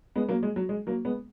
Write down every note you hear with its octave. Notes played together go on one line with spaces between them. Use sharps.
G#3 B3
F#3 A#3
G#3
F#3
G#3
F#3 A#3
G#3 B3